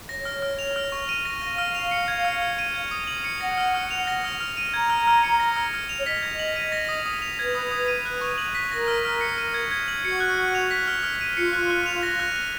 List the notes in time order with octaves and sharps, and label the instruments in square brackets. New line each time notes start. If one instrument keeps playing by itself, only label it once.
[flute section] C#5 [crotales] A#6
[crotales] F6
F6
F7
F6
C#6
D#7
A#6
[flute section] F5 [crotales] A#6
[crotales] F6
F7
C#7
G#6
F6
F6
D#7
G#6
D#6
F#7
C#7
[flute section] F#5 [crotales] A#6
[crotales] F6
F6
F7
A#6
F6
F6
D#7
[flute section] A#5 [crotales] G#6
[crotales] F6
F6
C#7
A#6
F6
F6
F7
[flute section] C#5
[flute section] D#5 [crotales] B6
[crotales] G#6
F#7
D#7
A#6
D#6
D#6
F7
[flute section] B4 [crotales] G#6
[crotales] D#6
D#6
D#7
F#6
C#6
F#7
B6
[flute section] A#4 [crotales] A#6
[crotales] F6
F6
C#7
D#7
G#6
G#6
F#7
[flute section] F#4 [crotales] C#7
[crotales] F#6
F#6
F7
B6
F6
F6
D#7
[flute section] F4 [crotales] C#7
[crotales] F#6
F#6
F7
A#6
F#6
F#6